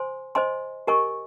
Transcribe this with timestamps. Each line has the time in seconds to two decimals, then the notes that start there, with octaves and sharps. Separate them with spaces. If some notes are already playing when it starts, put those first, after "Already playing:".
Already playing: C5 G#5 C6
0.35 C5 D#5 G#5 C6
0.87 G4 A#4 D#5 G#5 C#6